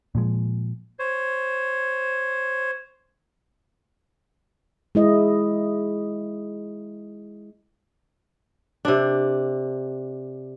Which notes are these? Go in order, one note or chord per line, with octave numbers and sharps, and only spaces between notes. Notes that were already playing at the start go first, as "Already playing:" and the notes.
A#2 F3 G#3
C5 C#5
G#3 E4 D#5
C3 D4